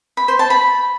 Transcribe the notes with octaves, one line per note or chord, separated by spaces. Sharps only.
B5
C5
A5
B5